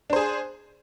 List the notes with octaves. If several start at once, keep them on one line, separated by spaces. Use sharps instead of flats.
D4 G#4 C5